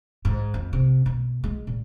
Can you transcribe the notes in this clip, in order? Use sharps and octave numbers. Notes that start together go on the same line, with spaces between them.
G#2
F2
C3
B2
G#3
A#2